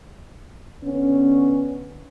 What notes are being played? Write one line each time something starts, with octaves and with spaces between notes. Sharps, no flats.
D3 B3 C#4